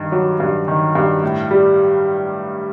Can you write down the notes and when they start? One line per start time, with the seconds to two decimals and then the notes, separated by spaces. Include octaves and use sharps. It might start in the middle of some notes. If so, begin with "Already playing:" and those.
Already playing: G2 D#3
0.12 F#3
0.40 G2
0.68 D#3
0.95 G2
1.23 A2
1.51 G3